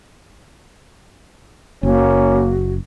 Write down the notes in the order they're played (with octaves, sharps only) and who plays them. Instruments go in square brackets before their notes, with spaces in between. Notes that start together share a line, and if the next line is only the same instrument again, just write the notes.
[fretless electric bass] F#1 [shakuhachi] A#3 [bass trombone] C#4 [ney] F#4